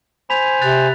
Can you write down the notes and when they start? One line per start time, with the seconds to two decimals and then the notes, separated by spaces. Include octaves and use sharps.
0.30 C5 G#5 B5 B6 F7
0.62 C3 F#6 A6 F7